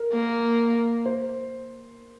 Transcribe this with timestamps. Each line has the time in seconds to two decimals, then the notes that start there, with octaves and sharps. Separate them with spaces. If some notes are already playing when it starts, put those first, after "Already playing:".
Already playing: A#4
0.13 A#3
1.05 C5